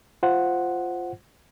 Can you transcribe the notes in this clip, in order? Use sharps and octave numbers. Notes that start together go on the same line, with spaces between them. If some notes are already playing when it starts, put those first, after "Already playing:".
F4 C5 F#5